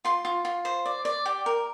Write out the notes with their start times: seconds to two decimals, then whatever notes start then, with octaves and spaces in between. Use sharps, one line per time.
0.05 F4 C6
0.25 F4
0.45 F4
0.65 C5
0.86 D5
1.05 D5
1.26 G4
1.46 A#4